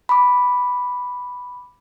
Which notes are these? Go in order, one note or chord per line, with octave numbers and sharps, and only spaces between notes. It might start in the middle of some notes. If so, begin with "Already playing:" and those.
B5 D6